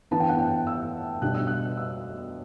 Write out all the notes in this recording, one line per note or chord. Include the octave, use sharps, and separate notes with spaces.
E3 B3 D4 A5
G5
F#5
G5
E6
B2 G3 D4 F#6
E6
F#6
E6